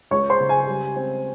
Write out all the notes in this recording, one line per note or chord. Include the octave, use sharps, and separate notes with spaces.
C#2 C#5 C#6
C5 C6
C#3
G#5
G3
C4